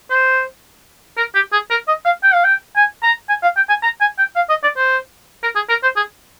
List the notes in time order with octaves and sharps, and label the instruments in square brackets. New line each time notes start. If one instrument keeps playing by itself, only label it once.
[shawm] C5
A#4
G4
G#4
A#4
D#5
F5
G5
F5
G5
G#5
A#5
G#5
F5
G5
G#5
A#5
G#5
G5
F5
D#5
D5
C5
A#4
G#4
A#4
C5
G#4